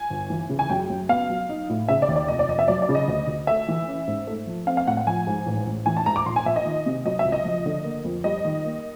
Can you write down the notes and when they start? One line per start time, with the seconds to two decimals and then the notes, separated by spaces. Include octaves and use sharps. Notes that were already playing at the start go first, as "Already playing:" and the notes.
Already playing: G#5
0.10 G1
0.30 E3
0.49 C#3
0.59 G#5
0.70 F#2 G5
0.90 F#2
1.09 B3 F5
1.30 F#3
1.49 D#4
1.70 A2
1.88 C#3 E5
2.02 D5
2.09 D#2
2.16 D5
2.28 F1 D#5
2.39 D5
2.48 F1 D#5
2.59 E5
2.68 F#3 D5
2.82 D5
2.89 C#3
2.95 D#5
3.08 D2
3.27 D2
3.47 A3 E5
3.68 E3
3.88 C#4
4.07 G#2
4.27 A3
4.47 F3
4.67 C4 F5
4.77 F5
4.87 A2 F#5
4.97 F#5
5.07 F3 G#5
5.27 G#2
5.46 A1
5.67 A1
5.86 E3 G#5
5.97 A5
6.06 G#2 A#5
6.16 D6
6.26 A#1 C6
6.36 G#5
6.45 A#1 E5
6.56 D#5
6.65 D#3
6.86 C3
7.05 F#3 D#5
7.19 E5
7.25 C#2
7.32 D#5
7.45 F3
7.66 D3
7.84 A#3
8.05 F2
8.24 G3 D#5
8.45 D#3
8.65 A#3